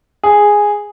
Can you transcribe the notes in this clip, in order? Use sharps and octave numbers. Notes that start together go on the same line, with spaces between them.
G#4